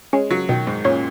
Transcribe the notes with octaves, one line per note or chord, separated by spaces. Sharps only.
G#3 C#4
F#3
B2 D#3
G#2
A#2 C#4